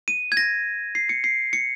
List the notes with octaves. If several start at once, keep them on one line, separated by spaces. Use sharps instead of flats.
D#7
G#6
A#6
C7
C#7
C7
C#7